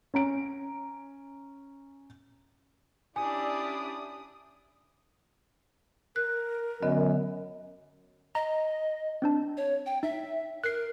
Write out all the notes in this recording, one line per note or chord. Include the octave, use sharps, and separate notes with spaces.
C#4 A#5 D7
C#4 D4 E4 G4 D5 G#5 D#6
A#4 F#6
F#2 D3 B3 D#5
D#5 A#5
C4 D4 A5
C#5
G5
D#4 E5
A#4 F#6 C7